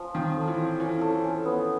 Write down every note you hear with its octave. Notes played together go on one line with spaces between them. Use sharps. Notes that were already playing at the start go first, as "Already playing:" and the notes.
Already playing: F3 C#4
D#3 F4
A4
E3
F4
E3 C#4
A4
C#4
B3